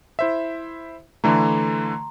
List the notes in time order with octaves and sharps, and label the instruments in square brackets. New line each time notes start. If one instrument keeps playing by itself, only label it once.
[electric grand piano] E4 C5 E5
[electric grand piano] D3 E3 A3 [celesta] A#5 C6